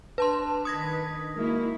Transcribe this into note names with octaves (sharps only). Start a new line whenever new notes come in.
D4 B4 A5 C6
D#3 B4 D#6 G#6 A#6
G#3 A#3 D#4 E4 F#4 A#4